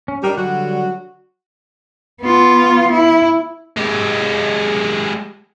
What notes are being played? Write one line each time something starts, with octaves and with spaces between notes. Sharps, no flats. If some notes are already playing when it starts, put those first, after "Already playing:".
C#4
G3 D4 D#4 A#4
D3 F#3 G3 F#4
B3 F4
E4
G#3 G4